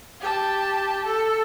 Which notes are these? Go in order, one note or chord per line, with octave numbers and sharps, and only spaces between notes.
G4 A5
A4